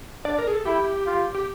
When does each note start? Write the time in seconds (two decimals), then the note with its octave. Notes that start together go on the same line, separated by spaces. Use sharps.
0.25 D4 D5
0.38 A#4
0.47 G#4
0.52 A4
0.65 E4 G4
1.06 F4
1.35 G4